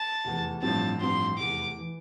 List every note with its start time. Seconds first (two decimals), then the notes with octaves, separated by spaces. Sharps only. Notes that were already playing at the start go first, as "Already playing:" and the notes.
Already playing: A5
0.25 F1 E2 E3
0.62 A1 G2 F3 C4 A5
1.00 A1 G2 F3 C4 C6
1.37 F1 E2 E3 D6
1.79 E3